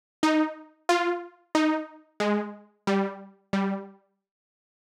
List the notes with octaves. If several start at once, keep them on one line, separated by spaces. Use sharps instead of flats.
D#4
F4
D#4
G#3
G3
G3